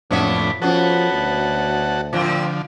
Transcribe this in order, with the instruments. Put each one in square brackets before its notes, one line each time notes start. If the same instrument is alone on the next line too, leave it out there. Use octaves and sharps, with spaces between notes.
[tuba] F#1 [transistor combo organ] F2 A2 D4 [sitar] B3 C4 E5
[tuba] F3 [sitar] B3 C#4 [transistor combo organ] F#4 A4
[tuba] D2
[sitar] A2 C4 F4 [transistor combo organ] D3 F3